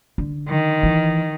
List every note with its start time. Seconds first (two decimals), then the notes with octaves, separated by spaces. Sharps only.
0.18 D3
0.49 D#3
0.83 E3